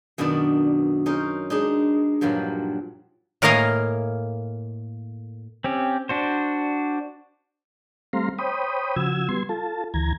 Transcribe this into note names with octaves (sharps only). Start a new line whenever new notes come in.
F#2 B2 D#3 B3 D4 D5
C#4 D#4 A#4 C5
G#3 D4 D#4
G2 A#2 F3 F#3
A2 A#3 A#4 D#5 F5 G#5
C4 C#4 G4
D4 F#4 C5
G3 A3 C4 F5 A#5 C6
C5 C#5 G5 B5 D#6
C#3 F3 F#4 E6 G#6
G3 B3 C6 G#6
F4 A4 A5
D2 E3 A#5 G#6